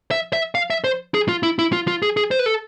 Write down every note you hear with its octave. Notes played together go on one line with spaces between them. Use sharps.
E5
E5
F5
E5
C5
G#4
F4
E4
E4
F4
F4
G#4
G#4
C5
B4
A4